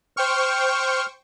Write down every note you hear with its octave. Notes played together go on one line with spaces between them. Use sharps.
C5 G5 C#6 F6